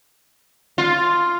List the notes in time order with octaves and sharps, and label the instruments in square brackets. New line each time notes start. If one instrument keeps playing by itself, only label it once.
[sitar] F4